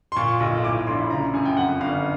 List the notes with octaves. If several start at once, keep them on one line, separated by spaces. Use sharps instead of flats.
C6
A#2 C#6
B1
A2 D6
A#1 C6
B5
C#3 A#5
F#2 G#5
G5
F2 F#5
G1 F5